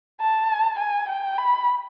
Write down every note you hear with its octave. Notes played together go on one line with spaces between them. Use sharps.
A5
G#5
G5
B5